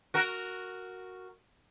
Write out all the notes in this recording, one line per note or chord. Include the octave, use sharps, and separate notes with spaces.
F#4 A#4